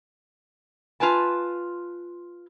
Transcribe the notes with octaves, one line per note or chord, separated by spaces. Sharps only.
F4 B4 G#5 A5